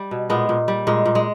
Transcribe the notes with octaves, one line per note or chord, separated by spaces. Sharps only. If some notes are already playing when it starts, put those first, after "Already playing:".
Already playing: G3
B2
A#2 G#3 B3
A#2
G3
A#2 G#3
A#2
G#3